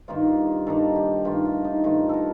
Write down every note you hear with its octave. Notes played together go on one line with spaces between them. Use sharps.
G2 D#3 A#3 D#4 F4
G2 D#3 A#3 D#4 A4
G4
G2 D#3 A3 F4
F4
D#4
G2 D#3 A3 F4
A4 A#4